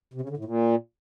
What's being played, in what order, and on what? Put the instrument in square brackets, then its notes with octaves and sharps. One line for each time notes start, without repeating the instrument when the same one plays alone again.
[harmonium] C3
C#3
D3
A2
A#2